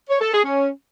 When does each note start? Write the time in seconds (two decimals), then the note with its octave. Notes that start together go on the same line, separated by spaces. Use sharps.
0.09 C#5
0.20 A4
0.32 G#4
0.43 C#4